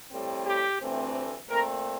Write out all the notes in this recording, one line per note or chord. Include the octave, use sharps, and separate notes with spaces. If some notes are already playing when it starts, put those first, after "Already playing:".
A2 G3 C4
G4
D2 C3 E3 A3 C4
A#2 A3 C4 A#4